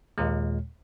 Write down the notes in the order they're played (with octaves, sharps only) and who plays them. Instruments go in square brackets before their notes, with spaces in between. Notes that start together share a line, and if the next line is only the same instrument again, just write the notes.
[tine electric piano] D#2 A#2 G#3